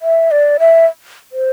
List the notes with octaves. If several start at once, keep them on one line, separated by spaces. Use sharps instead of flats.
E5
D5
E5
C5